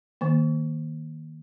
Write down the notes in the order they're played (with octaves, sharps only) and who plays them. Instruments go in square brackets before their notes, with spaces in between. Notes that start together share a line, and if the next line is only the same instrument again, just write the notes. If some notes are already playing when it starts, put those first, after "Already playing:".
[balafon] D#3 A#3